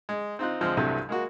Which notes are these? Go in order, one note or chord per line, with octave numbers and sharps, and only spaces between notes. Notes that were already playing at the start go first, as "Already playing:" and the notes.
G#3
C4 D#4 F4 F#6
D2 F3 G#3 C4 F6
C2 G2 C3 E3 F#3 A3
G#3 A#3 F#4